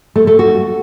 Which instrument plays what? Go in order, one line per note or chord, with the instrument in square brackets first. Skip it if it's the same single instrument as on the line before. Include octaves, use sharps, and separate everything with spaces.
[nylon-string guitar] A3
A3
F#4